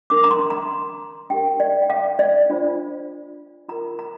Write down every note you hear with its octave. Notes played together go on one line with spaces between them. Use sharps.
D4 A#4 D6
A#5
C6
A#5
D4 G4 A#4 G5
D5
G5
F5
D5
D4 F4 C5
F4 A#4 A#5
A#5